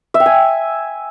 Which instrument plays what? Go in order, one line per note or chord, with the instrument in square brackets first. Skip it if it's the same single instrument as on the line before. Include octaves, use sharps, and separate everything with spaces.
[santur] E5
G5
G#5